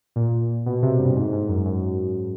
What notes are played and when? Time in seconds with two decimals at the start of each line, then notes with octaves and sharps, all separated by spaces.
0.16 A#2
0.66 B2
0.82 C3
0.99 G2
1.16 G#2
1.33 G#2
1.49 F#2
1.66 F#2